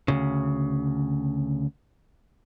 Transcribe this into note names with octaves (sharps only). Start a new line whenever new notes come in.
D2 A#2 C#3